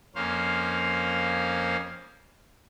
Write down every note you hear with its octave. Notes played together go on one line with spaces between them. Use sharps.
F2 A#3 C#4 C5 F5